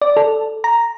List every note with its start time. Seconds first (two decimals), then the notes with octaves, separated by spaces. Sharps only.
0.02 D5
0.17 A4
0.64 A#5